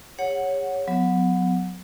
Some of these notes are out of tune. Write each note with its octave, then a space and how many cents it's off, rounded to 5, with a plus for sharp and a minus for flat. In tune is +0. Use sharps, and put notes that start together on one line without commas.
G4 +45 C#5 +0 F#5 +0
F#3 -20 B3 +25